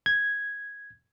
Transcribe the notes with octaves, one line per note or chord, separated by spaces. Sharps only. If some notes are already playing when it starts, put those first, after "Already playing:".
G#6